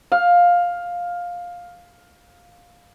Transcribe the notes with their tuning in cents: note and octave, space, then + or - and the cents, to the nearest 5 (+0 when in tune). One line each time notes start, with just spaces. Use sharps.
F5 +10